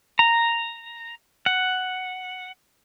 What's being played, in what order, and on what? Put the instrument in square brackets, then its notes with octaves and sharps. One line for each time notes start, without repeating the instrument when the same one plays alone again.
[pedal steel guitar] A#5
F#5